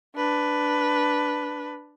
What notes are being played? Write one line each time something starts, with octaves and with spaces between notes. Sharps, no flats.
D4 B4